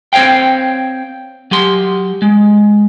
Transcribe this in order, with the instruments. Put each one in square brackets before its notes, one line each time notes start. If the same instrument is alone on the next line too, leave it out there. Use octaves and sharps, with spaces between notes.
[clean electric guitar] C4 C5 C#5 F5 G5
F#3 G4 C6
G#3